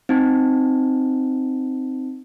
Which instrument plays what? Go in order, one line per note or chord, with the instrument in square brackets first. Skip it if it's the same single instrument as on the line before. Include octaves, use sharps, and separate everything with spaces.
[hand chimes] C4 D#4